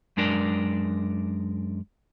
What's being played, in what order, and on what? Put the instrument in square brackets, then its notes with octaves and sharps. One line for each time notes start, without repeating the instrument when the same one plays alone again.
[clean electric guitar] F#2 G#3 D4 A#4 D5